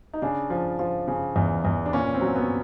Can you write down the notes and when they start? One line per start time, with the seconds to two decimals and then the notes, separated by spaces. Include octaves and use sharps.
0.13 D#4
0.22 C#3 D4
0.50 F3
0.79 F3
1.08 C#3
1.36 E2
1.65 E2
1.86 D4
1.93 A#2 C#4
2.14 C4
2.21 F#3
2.36 B3